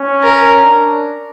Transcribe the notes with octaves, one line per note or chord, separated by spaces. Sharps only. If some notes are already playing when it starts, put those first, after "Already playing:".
Already playing: C#4
A#4
D4